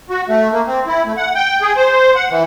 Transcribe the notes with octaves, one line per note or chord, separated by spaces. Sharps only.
F#4
A3
A#3
C4
E4
A3
F#5
G5
G#4
C5
F#5
E3